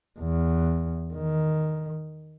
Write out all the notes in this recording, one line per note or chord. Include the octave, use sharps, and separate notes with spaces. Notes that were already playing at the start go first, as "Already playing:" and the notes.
E2
D#3